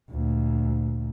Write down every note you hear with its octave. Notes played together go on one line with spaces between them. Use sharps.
D2 A#2